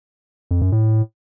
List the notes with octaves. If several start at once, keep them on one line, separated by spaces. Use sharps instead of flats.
F2
F#2
A2